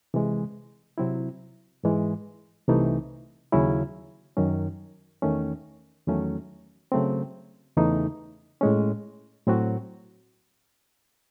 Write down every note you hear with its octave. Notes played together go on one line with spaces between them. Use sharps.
C3 E3 G#3
C3 F#3 C4 E4
G#2 E3 G#3
C2 C3 E3 A3 D#4
D#2 C#3 F#3 C#4 E4
F#2 D#3 F#3 C#4
E2 D#3 A3 C#4
E2 D#3 F#3 A3 C#4
C#3 F#3 A3 C4
E2 C#3 E3 A3 D#4
A2 G#3 C#4
A2 F#3 C4 F#4